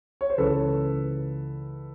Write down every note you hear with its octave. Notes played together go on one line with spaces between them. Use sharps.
C#5
C5
C#2 C#3 E3 A4 B4